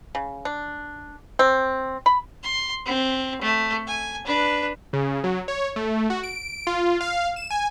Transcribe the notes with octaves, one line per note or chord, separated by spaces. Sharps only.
C#3
D4
C4
B5
C6
C4
A3
G#5
D4 B4
C#3
F#3
C#5
A3
F#4
D7
F4
F5
E7
G#5